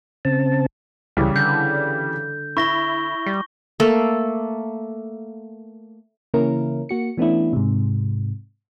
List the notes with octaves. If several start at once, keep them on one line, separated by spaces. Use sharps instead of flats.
C#3 C4 A5
C#2 C#3 E3 G3
D3 G6
E4 C#6 A#6 G7
G3
A3 A#3 A4
C#3 E3 A#3 C#4 E4 A#4
A#3 F#4 C#7
E3 A3 B3 C#4 D4 E4
G#2 C3